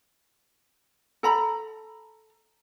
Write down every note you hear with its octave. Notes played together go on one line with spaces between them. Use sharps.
A4 A#5 B5